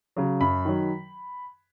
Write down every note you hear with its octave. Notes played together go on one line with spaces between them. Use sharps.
C#3 F#3
F#2 B5
D#3 F#3